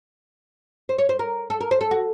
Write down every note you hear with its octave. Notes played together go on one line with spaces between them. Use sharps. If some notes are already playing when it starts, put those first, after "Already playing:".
C5
C#5
C5
A#4
A4
A#4
C5
A4
F#4